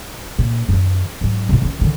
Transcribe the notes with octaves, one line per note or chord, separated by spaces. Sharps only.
A#2
F#2 D#3
G#2 F#3
C2 A2
D#3 C#4
D3 D#3